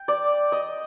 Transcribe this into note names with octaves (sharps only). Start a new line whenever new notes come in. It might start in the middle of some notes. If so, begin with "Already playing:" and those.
Already playing: G5
D5
D#5